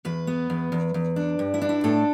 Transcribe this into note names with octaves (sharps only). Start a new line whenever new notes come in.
E2 B4
B3
E2
E2
E2
D4
G2
E4
D4
E4
A2 A4